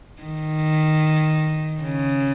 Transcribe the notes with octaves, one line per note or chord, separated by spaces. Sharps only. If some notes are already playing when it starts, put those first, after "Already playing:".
D#3
C#3